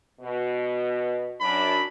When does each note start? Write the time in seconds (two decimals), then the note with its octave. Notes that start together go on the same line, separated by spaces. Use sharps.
0.21 B2
1.41 F#2 D4 B5